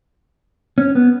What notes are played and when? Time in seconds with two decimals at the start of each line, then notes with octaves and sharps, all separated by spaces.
0.78 C#4
0.95 B3